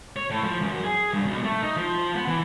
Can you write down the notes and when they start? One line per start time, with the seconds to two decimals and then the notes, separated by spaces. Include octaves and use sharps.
0.16 C#5
0.30 A2
0.44 F3
0.62 F#2
0.83 G#4
1.13 G2
1.26 B1
1.44 A3
1.62 D#4
1.76 F3
2.15 B3
2.27 E3